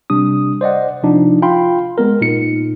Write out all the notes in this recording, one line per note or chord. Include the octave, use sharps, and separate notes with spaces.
C3 G3 D4 D#6
C5 D5 D#5 F#5
C3 F3 D4 D#4
F4 F5 G5 B5 C6
G#3 B3 A#4
A#2 D#4 C#7